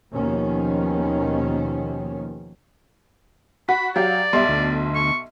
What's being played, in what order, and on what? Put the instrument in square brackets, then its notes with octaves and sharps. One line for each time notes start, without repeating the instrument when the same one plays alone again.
[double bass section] D#2 B2 D#3 F3 C#4
[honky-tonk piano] F#4 [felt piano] F#5 [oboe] B5
[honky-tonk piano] F#3 G4 F5 [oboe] D5
[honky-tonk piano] B1 [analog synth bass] G3 [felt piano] E5 C6
[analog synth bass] D2
[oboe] C#6